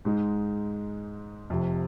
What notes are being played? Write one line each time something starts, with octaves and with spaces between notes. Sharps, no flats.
G#2 G#3 D#4
F1 F2 C3